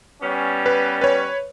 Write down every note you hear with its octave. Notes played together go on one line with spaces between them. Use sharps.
G3 B3 C#4
B4
B4 C#5